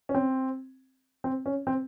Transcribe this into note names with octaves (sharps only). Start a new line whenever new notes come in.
C#4
C4
C4
C#4
C4